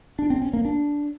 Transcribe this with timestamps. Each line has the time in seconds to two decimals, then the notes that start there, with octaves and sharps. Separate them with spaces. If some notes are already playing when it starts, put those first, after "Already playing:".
0.19 D4
0.30 C4
0.42 C#4
0.53 A#3
0.65 D4